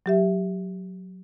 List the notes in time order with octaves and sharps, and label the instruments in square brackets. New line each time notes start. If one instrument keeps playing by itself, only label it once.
[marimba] F#3 G4 E5